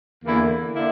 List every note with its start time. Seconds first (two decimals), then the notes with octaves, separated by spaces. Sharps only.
0.22 E2 D3 A#3 E4
0.75 D3 A#3 E4